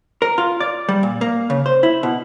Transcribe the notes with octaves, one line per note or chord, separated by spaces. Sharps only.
A#4
F4
D5
G3
A#2
A#3
C#3
C5
E4
B2